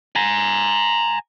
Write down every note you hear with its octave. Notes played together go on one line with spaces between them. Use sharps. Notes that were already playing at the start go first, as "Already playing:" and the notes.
G#5 A#5